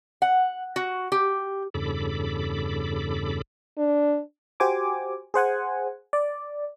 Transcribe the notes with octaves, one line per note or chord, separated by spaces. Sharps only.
F#5
F#4
G4
E2 G2 C#3 A4 B5 D6
D4
F#4 G4 C5 G#5 D6
G#4 C5 F#5 G#5
D5